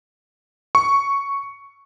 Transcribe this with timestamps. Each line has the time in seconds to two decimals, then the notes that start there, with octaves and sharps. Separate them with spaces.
0.75 C#6